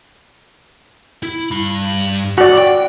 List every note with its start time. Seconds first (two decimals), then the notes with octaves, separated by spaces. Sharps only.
1.23 E4
1.52 G2 B5
2.38 F#4 D5 B5
2.58 G5